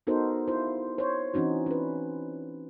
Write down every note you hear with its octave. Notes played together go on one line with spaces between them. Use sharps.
B3 D#4 F#4 A4 A#4 C5
E4 F4 C5
C5 C#5
E3 C4 C#4 D#4 F#4
C#4 B4